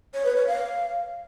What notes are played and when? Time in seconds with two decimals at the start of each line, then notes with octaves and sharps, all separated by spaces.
0.14 C#5
0.25 B4
0.36 C#5
0.47 F5